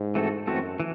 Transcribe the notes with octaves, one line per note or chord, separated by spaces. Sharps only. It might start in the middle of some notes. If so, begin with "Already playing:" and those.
Already playing: G#2
E3 A3 C4 F#4 A4
F#2 E3 A3 C4 F#4 A4
E3